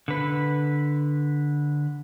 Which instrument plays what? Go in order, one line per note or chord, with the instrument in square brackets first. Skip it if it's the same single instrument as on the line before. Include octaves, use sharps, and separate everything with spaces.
[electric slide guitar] D3 B4